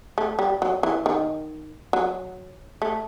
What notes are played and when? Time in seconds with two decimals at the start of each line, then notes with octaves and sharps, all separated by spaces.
0.18 A3
0.39 G3
0.62 F#3
0.83 E3
1.06 D#3
1.93 F#3
2.82 A3